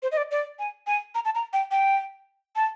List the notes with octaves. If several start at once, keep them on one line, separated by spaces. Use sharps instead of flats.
C5
D#5
D5
D5
G#5
G#5
A#5
A5
A#5
G5
G5
A5